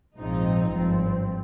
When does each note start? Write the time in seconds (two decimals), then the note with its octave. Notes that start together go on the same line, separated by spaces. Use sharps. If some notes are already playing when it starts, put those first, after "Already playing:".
0.17 A#1 G#2 F3 C4 D#4
0.72 G#1 G2 F3 C4